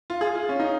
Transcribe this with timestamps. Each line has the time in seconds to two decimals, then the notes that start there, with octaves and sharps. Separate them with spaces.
0.10 F4
0.21 G#4
0.35 F4
0.49 C#4
0.60 D#4